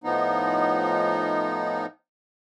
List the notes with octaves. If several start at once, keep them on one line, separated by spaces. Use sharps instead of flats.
A2 F3 B3 D#4